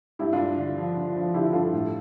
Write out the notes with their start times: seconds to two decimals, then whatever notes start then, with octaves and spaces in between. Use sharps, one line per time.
0.19 G2 E4 G4
0.33 D4 F4
0.39 G2
0.57 D3
0.77 F3
0.97 D3
1.16 F3
1.34 D3 E4 G4
1.53 G2 F4 A4
1.72 A2